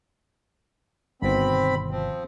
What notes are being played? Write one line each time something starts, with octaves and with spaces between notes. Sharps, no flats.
G1 B2 D#3 C4 B5
F3 C4